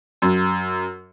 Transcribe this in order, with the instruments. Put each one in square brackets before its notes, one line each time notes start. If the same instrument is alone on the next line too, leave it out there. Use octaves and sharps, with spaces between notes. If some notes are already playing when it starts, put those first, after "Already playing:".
[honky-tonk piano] F#2